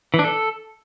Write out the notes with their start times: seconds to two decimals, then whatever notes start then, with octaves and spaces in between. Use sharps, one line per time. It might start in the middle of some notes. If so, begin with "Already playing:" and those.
0.14 E3
0.19 D4
0.24 A4